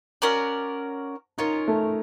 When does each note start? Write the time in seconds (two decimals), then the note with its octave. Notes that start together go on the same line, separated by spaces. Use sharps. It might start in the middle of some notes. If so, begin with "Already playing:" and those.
0.22 C#4 F#4 A#4 D5
1.38 C#4 D#4 F4 A#4 C#5
1.68 A3